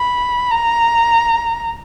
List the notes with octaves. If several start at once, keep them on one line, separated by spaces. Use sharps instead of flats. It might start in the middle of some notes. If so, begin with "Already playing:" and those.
Already playing: B5
A#5